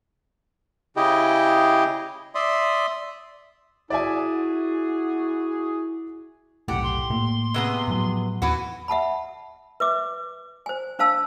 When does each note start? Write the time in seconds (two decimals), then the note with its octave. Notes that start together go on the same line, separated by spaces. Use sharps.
0.97 C#3 E4 G4 G#4 D#5 G5
2.35 D5 E5 C6 D#6
3.90 E4 F#4 G#4 D5 E5 G#5
6.68 F1 B1 A2 G4 F#5
6.84 C6
7.10 A2 A3 A#3
7.54 C3 B3 G#4
7.88 A2 F3 F#3
8.42 D#2 E3 B3 F#4
8.88 E5 F#5 A5 B5
9.80 B4 E5 D6
10.66 C5 G#5
10.99 D4 C5 F5 A5 E6